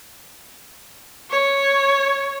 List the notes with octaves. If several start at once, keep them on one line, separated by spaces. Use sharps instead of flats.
C#5